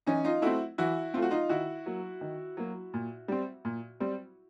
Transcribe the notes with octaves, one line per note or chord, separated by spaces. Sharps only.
E3 C#4 D#4
D#4 F4
A3 C4 E4 F#4
E3 E4 F#4
A3 C4 F4
F#4
D#4 F4
D#3 E4 F#4
F#3 A#3
D#3
F#3 A#3
A#2
G3 C4
A#2
G3 C4